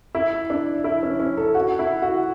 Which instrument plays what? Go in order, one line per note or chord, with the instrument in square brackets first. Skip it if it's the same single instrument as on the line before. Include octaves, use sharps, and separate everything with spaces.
[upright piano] E4
D4
E4
C#4
C#4
A4
F#4
E4
F#4